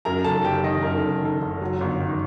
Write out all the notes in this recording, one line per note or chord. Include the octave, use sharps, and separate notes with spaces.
F#2 A#4 A#5
F#1 A4 A5
F#1 G4 G5
D#3 D#4 D#5
F#2 A#4
A4
F#1
D#3 A4
F#1
F#3
G1
D#3